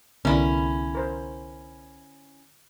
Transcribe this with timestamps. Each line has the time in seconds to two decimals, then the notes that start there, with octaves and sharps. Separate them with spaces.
0.25 C2 D3 B3 C#4 E4 A#4
0.95 A#4 C5